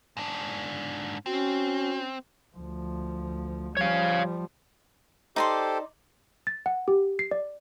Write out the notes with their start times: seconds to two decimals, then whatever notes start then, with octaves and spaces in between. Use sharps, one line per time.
0.17 G#2 D4
1.26 C4 C#4 F#4
2.57 D2 F3
3.77 F3 G3 C#5 F5
5.36 D#4 G4 A4 C5 D5 C6
6.47 A6
6.66 F#5
6.88 G4
7.19 C7
7.31 D5